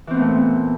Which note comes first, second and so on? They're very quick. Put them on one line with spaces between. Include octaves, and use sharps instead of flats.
E3 C4 B3 A3 A#2